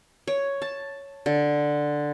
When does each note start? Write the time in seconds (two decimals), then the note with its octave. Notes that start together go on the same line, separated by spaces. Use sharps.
0.27 C#5
0.62 A5
1.26 D3